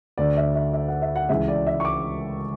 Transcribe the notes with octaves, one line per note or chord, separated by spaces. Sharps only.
D2 D3 D5
E5
E5
E5
F#5
E5
F#5
C#2 C#3 E3 E5
D5
E5
C#6
D6